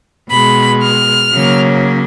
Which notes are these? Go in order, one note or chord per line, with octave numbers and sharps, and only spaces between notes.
B2 G#3 B5
F6
C#3 F#3 A#3